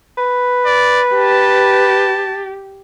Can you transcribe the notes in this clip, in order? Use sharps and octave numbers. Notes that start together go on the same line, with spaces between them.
B4
D5
G4 A5